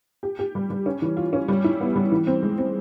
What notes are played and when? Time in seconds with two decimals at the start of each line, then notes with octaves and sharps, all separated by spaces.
0.23 G4
0.39 G4
0.55 G3
0.70 G3
0.86 C#4
1.02 E3
1.17 F4
1.33 C#4
1.48 G3
1.64 E4
1.81 B3
1.96 G3
2.12 E3
2.27 C4
2.43 G#3
2.58 C4